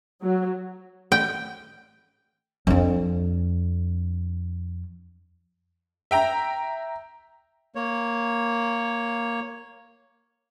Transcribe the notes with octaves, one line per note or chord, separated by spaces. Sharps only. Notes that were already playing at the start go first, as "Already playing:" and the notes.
F#3
G5
F2 D4
E5 G5 A#5
A#3 C#5